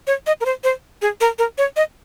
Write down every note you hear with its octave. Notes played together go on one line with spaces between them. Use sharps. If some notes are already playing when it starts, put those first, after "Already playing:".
C#5
D#5
A#4
C5
C5
G#4
A#4
A#4
C#5
D#5